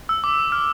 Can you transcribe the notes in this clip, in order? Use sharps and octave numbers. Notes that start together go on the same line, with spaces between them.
E6
D6
F6